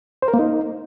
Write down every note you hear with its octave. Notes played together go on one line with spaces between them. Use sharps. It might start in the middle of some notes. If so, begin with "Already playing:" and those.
C5
A#4
A#3
D#4